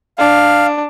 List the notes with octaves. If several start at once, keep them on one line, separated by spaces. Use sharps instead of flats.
D4 F5